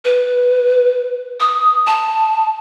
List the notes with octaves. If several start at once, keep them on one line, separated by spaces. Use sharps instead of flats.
B4
D#6
A5